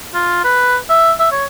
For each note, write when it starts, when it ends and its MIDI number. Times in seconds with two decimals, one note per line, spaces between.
0.14 0.41 65
0.44 0.76 71
0.90 1.12 76
1.19 1.28 76
1.32 1.45 73